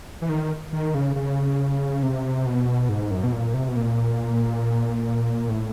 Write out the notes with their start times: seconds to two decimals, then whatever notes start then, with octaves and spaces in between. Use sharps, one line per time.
0.22 E3
0.29 D#3
0.72 D#3
0.94 C#3
1.16 C#3
2.03 C3
2.46 B2
2.89 G#2
3.11 F#2
3.24 B2
3.33 A#2
3.54 C3
3.68 B2
3.76 A#2
5.49 A2